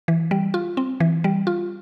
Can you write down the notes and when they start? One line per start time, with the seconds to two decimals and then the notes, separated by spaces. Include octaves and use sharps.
0.08 E3
0.31 G3
0.54 F4
0.77 C4
1.00 E3
1.24 G3
1.47 F4